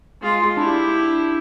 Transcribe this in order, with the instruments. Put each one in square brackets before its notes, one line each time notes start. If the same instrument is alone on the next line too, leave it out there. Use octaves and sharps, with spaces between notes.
[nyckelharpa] G#3 F4
[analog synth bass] D4 [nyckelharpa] E4 G4